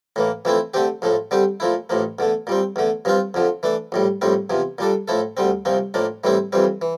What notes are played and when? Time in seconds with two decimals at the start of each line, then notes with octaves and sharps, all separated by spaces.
0.16 A2 E3 A#3
0.45 F2 E3 A3 C4 E4
0.74 D3 A3 C4 G4
1.02 A#1 A2 F3 A3
1.31 D3 G3 C4 G4
1.60 A#2 F3 A3 E4
1.90 A1 A2 F3 A#3
2.19 E2 D3 A3
2.47 A#2 G3 C4
2.76 E2 D3 A3
3.05 G2 F3 C4 F4
3.34 F2 D3 F3
3.63 E3 A3 D4
3.92 A#1 A2 G3
4.22 A#1 A2 G3 C4
4.50 E2 C3 F3
4.78 A#2 G3 D4 A4
5.08 A2 F3 A3 E4 A4
5.37 D2 D3 G3 C4
5.65 C2 A#2 F3 C4
5.94 A2 F3 A#3 D4
6.24 A2 E3 G3 C4 E4
6.52 F2 E3 G3 C4
6.82 E3